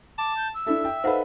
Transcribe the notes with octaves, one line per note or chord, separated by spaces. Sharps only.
A5 D6
G6
E6
D4 E4 A4 E5
G5
D#4 A4 B4 C5 F5 F#5